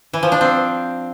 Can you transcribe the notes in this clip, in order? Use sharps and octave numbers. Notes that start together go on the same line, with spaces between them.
E3
F3
D4
C4